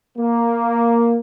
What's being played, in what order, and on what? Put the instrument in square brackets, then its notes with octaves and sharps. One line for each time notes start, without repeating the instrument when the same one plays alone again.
[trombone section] A#3